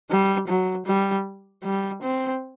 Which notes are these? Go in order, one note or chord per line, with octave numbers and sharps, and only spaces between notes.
G3
F#3
G3
G3
C4